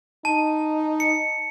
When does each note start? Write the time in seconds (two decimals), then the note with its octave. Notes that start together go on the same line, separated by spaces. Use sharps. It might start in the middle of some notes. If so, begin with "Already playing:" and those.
0.25 D#4 A5
1.00 C#7